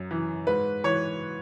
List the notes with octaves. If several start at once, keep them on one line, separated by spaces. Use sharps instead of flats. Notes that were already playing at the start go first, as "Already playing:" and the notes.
Already playing: F#2
E3
G#2 B4
E3 C#5